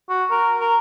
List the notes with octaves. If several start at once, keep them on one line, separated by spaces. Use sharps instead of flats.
F#4
A#4
A#4